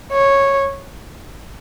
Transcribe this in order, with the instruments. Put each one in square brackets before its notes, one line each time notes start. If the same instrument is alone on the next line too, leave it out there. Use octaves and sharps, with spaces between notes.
[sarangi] C#5